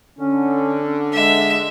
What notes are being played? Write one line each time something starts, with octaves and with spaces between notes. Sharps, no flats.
D3 C#4
G#3 E5